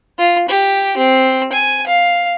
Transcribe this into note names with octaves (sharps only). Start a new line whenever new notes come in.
F4
G4
C4
G#5
F5